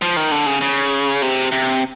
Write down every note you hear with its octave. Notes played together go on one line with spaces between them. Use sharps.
F3
D#3
D3
C#3
C#3
C3
C3